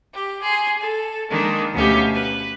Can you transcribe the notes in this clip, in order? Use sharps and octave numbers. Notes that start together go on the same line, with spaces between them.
G4
G#4 C6
A4
D#3 G#3 A#3 D4
D2 B2 C#4 G4 E5 F5
B4